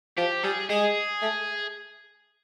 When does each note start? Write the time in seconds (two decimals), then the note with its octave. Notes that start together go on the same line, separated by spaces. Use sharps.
0.18 F3 G4
0.44 G3 G#4
0.69 G#3 G#4
1.22 A3